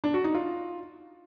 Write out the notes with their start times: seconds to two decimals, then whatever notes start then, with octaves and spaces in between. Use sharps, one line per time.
0.04 D4
0.14 F#4
0.24 D#4
0.35 F4